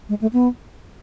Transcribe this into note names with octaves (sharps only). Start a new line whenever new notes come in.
G#3
A3
B3